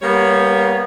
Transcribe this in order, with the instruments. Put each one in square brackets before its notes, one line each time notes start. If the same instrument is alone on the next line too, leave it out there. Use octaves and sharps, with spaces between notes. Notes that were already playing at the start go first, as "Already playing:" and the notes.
[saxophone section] G3 A#3 B3 C#5